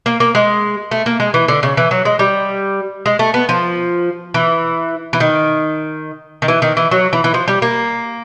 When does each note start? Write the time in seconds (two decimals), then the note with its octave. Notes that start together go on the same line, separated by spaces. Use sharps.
0.06 A#3
0.20 A#3
0.35 G#3
0.91 A3
1.06 A#3
1.20 G#3
1.34 E3
1.48 D3
1.63 C#3
1.77 E3
1.91 F#3
2.05 G#3
2.19 G3
3.06 G#3
3.19 A3
3.34 B3
3.49 F3
4.34 E3
5.13 E3
5.20 D#3
6.42 D#3
6.48 E3
6.62 D#3
6.77 E3
6.91 F#3
7.13 E3
7.24 E3
7.34 F3
7.48 G3
7.62 A#3